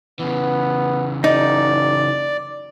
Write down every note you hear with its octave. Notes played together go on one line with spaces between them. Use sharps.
C#3 E3 B3
F#1 D#4 D5